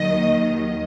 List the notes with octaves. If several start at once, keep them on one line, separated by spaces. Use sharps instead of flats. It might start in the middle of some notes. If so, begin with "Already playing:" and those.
Already playing: D#2 D#3 F#3 D#5